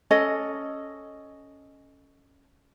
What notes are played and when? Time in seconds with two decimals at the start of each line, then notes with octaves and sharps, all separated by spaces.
0.11 C#4 A4 D#5